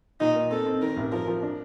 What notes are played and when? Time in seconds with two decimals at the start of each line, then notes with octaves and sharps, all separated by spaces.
0.20 A#2 D#4
0.36 A#3
0.51 C4 A4
0.66 C4
0.82 D#3 A#4
0.97 A1
1.12 F3 A#4
1.28 F3
1.43 D4